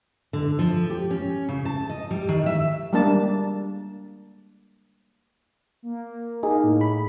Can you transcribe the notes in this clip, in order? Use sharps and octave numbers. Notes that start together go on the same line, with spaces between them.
D3
F3
G4
C#4
C#3
A5
D#5
G3
D#3
E5
G3 G#3 A#3 D4 A5
A#3
A#3 D#4 G#4
A2
B5